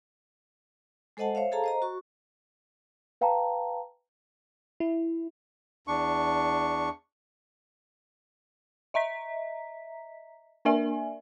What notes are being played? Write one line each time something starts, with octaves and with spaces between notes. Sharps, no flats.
G#3 A4 C5 D#5 F#5 A5
C5 C#5 E5 F5
G#4 A4 F5 A5 A#5
C5 D#5 A#5
F#4 C#6
B4 F5 G5 A5 A#5
E4
E2 D4 C#6
D#5 E5 A#5 B6
A#3 D4 A#4 D5 E5 G#5